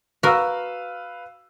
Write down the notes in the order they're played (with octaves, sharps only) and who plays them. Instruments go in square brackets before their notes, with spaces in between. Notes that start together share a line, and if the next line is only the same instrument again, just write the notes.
[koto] F#4 A#4 [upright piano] B4 F5 E6